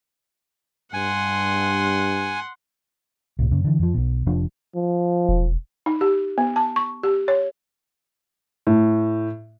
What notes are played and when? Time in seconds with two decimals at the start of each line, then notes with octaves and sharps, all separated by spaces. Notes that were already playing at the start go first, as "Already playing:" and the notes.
0.93 G2 F#5 G#5 C6
3.39 C2 A2
3.51 F#2 C#3
3.64 D3 E3
3.79 F2 F3
3.94 B1 B2
4.26 F1 F3 D4
4.75 F3
5.29 E1
5.86 D#4
6.01 G4
6.38 B3
6.56 A5
6.76 C#6
7.03 G4
7.28 C#5
8.67 A2